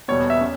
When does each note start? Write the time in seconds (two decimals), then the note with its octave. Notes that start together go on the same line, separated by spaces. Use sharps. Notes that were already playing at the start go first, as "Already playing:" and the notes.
0.08 E2 B2 G3 B3 C#5
0.30 E5
0.41 C#4